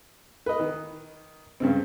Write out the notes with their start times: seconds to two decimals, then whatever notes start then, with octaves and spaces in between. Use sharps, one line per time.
0.46 B4 D#5
0.60 D#3
1.60 G2 C#3 C4